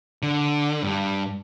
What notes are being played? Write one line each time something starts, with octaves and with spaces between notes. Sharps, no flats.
D3
G2